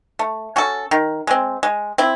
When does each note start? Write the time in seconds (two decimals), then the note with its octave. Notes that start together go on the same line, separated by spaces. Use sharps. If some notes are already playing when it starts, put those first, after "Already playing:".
0.19 A3
0.56 C#4 F#4 A4
0.91 D#3
1.27 G#3 C4
1.63 G#3
1.98 C4 E4